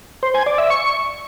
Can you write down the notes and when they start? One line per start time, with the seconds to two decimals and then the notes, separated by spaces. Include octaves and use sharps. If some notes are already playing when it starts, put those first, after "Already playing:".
0.23 C5
0.35 G#5
0.46 D5
0.58 E5
0.70 C#6